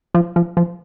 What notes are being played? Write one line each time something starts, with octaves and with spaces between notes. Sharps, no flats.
F3
F3
F3